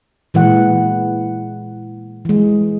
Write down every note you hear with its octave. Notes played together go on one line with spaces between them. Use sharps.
A#2 E3 G#3 F#5
E3 G#3